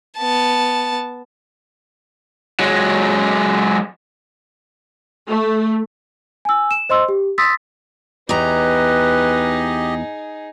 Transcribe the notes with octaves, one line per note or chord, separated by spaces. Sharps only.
B3 A5
F#3 G#3
A3
G#5 E6
E7
C5 D#5 C6 E6
G4
C6 D#6 E6 A6 B6
E2 D#4 G4 G#4 B4 D#5 A#5